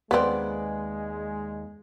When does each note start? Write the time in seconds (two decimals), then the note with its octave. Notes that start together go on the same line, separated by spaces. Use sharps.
0.11 D#2 G#3 B3 C4 B4 D5